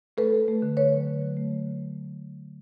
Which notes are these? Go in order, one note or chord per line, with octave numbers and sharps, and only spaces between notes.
A3 A4 B4
A3
A3
D3
D3 B4 C#5
F#3
D3
F#3
A3
A3